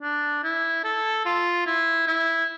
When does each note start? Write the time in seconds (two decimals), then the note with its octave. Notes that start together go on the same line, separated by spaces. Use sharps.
0.02 D4
0.44 E4
0.85 A4
1.26 F4
1.66 E4
2.07 E4